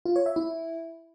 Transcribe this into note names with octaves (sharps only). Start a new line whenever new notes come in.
F4
C#5
E5
E4